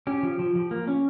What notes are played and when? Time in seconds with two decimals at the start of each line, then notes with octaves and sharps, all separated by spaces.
0.07 C#4 G4
0.23 F3
0.39 F3
0.55 F3
0.71 A#3
0.88 C#4